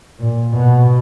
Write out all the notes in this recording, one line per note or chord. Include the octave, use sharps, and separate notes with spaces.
A#2
B2